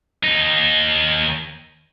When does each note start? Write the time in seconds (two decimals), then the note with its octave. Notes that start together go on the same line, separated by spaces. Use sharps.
0.23 D#2 D#4